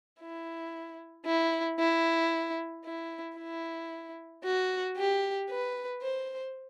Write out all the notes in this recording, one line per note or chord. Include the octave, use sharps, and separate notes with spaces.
E4
E4
E4
E4
E4
F#4
G4
B4
C5